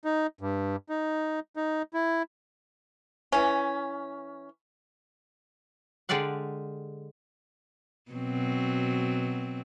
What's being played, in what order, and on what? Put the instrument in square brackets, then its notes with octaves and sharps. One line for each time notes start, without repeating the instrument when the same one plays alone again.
[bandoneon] D#4
G2
D#4
D#4
E4
[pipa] E3 C#4
[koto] D3 G#3 G4 D5 F5 F#5
[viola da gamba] B2 F#3 C4